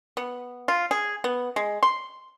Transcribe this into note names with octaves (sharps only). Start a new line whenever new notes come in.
B3
F4
G#4
B3
G#3
C6